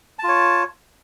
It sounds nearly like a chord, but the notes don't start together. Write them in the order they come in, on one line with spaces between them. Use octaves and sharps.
A5 F4 C#5